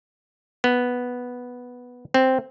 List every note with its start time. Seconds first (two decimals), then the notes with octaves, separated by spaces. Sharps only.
0.64 B3
2.14 C4